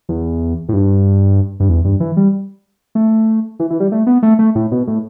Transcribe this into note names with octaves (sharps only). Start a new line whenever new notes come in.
E2
A2
G2
G2
E2
G2
E3
G3
A3
E3
E3
G3
A3
B3
A3
A3
A2
B2
A2